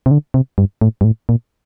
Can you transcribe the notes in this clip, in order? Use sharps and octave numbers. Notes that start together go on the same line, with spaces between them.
C3
D3
C3
G2
A2
G2
A2
A#2